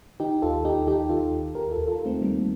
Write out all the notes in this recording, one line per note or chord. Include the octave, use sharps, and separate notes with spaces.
D#3 D#4 G4
D#2 F4 A4
D#2 D#4 G4
D#3 D#4 G4
D#3 F4 A4
D#2
D#2 G4 A#4
F4 A4
D#2
F4 A4
D#3
A3 C4
D#3 G3 A#3